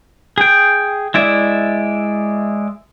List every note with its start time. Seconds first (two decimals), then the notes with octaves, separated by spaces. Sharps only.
0.38 G#4 G5
1.14 G#3 E4 D5 E5